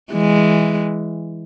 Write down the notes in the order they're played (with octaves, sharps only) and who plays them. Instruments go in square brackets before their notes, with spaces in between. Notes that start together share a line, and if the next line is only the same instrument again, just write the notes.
[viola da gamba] E3 G#3